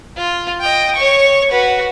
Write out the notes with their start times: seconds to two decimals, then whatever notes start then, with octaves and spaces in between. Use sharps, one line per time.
0.17 F4
0.60 D#5 G5
0.96 C#5 C#6
1.50 F#4 B4